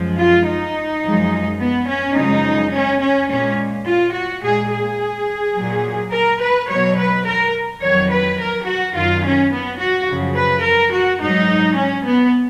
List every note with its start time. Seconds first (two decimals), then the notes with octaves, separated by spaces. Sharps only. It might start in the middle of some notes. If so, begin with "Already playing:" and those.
Already playing: F#2 F3 G#3
0.17 F4
0.45 D#4
1.02 F#2 F3 G#3
1.59 B3
1.86 C#4
2.15 F#2 C#3 F3 G#3 D#4
2.72 C#4
3.00 C#4
3.29 A#2 G#3 C#4
3.85 F4
4.13 F#4
4.42 A#2 G#3 G#4
4.71 G#4
5.54 A#2 F#3
6.11 A#4
6.39 B4
6.68 B2 F#3 C#5
6.97 B4
7.24 A#4
7.81 F2 D#3 F#3 C#5
8.10 B4
8.39 A#4
8.66 F#4
8.94 F#2 D#3 F#3 F4
9.24 C#4
9.52 B3
9.80 F#4
10.08 F#2 C#3 F3
10.36 B4
10.64 A#4
10.93 F#4
11.21 G#2 F#3 D#4
11.77 C#4
12.07 B3